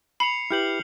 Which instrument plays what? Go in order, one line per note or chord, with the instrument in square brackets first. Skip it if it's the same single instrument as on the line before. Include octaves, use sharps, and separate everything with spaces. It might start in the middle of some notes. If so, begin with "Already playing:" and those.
[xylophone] B5 [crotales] C7 C#7 F7
[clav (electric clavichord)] E4 G4 B4 [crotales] F6 G6 F#7